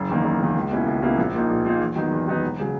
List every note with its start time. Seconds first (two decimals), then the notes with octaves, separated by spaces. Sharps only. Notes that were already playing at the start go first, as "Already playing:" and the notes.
Already playing: F#1
0.09 E2 D#3 A#3
0.24 F#1
0.40 E2 D#3 A#3
0.55 C#2
0.71 B2 A#3 C#4 E4
0.86 C#2
1.02 B2 A#3 C#4 E4
1.17 A#1
1.33 A#2 A#3 D#4
1.49 A#1
1.65 A#2 A#3 D#4
1.80 E2
1.96 D#3 F#3 B3 D#4
2.11 E2
2.27 D#3 F#3 B3 D#4
2.42 E1
2.60 C#3 F#3